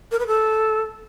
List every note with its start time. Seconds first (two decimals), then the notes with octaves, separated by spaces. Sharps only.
0.12 A#4
0.19 B4
0.27 A4